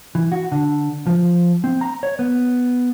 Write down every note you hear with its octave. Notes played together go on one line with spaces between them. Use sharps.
E3
F#4
D3
F3
C4
A#5
C#5
B3